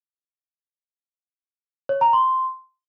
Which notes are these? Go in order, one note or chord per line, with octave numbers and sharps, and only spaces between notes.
C#5
A#5
C6